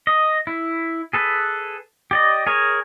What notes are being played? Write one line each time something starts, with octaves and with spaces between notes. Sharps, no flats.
D#5
E4
G#4 A4 B4
G4 D5 D#5
G#4 A#4 C#5